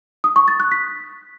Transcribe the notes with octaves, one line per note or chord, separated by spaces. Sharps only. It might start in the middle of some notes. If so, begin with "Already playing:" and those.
D#6
C#6
A6
F#6
B6